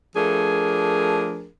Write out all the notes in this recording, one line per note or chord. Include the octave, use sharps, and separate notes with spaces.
F3 A3 D4 G#4 A#4